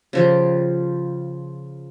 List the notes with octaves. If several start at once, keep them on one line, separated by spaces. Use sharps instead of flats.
C#3 F3 G4